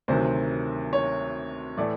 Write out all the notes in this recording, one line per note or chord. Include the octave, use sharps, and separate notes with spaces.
D2 C3 D#3 F#3 C5
C#5
A2 E3 A3 D5